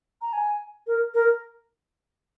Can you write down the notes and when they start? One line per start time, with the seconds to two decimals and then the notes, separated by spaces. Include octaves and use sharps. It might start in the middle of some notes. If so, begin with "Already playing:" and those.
0.22 A#5
0.33 G#5
0.87 A#4
1.14 A#4